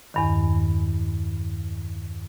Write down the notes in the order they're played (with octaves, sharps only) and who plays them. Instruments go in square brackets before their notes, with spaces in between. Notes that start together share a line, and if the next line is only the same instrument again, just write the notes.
[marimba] E2 G2 D#3